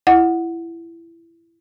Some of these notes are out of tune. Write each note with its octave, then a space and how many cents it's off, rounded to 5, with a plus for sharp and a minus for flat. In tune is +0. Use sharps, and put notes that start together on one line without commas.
E4 +20 D#5 +0 F#5 -5